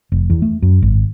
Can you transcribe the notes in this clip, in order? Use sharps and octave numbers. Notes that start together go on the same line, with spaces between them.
F1
E2
A3
F#2
G#1